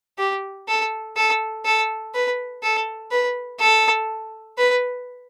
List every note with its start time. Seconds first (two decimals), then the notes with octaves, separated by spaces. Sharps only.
0.18 G4
0.68 A4
1.16 A4
1.65 A4
2.14 B4
2.63 A4
3.11 B4
3.60 A4
4.58 B4